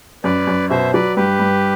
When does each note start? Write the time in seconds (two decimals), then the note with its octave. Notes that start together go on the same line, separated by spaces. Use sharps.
0.24 F#2 B4 D5
0.47 F#2
0.70 B2 C5 E5
0.94 F#3 B4 D5
1.16 G2 G4 B4
1.39 G2